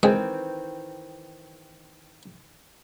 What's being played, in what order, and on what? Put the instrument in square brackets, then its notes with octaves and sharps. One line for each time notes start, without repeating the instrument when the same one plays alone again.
[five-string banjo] D#3 E3 C4 [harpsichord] G#3